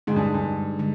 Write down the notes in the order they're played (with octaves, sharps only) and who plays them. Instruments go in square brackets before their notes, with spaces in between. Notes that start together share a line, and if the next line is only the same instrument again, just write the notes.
[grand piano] G#2 [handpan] D3 G#3 D#4 G#4
[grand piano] G2
G2
[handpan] D3 G#3